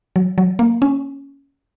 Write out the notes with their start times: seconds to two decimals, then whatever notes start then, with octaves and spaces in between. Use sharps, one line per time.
0.16 F#3
0.38 F#3
0.59 A#3
0.82 C#4